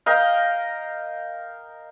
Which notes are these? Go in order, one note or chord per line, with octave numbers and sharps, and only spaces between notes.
A#4 D#5 F5 G5